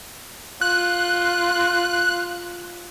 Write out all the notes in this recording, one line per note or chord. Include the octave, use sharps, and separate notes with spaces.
F4 F#6